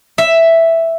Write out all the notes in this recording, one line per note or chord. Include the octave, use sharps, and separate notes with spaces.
E5